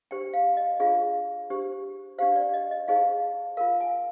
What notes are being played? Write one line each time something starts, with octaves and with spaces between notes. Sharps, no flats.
D4 G4 C5 G5
F5
D#5
D4 F4 G#4 C5 F5
D4 G4 C5
D4 G4 C5 F5
D5
D#5
D#5
D#4 G#4 C5 F5
F4 A#4 F5
G#5